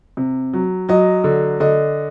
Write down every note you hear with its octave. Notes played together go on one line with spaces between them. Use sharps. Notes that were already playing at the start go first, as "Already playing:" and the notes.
C3
F#3
F#3 D#5
D3
D3 D#5